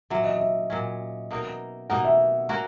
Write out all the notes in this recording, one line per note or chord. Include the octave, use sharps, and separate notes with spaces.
A#2 F#3 C#4 E5
D#5
E5
A#2 F#3 C#4
B2 A#3 D#4 A#4
B2 A#3 D#4 A#4 F#5
E5
A#3 C#4 F#4 A#4